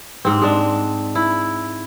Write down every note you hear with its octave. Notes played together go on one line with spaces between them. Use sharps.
G#2 C4
G#3 D4
E4